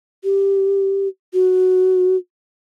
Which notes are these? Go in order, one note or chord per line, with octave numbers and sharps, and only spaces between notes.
G4
F#4